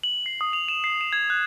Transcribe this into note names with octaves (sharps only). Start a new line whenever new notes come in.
F#7
C7
D#6
F7
E7
C7
E7
G#6
F#6